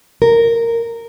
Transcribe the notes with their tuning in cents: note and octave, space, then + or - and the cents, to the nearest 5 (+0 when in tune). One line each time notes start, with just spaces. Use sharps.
A#4 -10